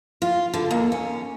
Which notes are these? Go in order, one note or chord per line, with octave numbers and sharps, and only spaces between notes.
F4
D3
D#2
C#4